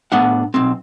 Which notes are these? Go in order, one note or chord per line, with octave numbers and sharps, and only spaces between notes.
A2 B3 D4 F#5
B1 C4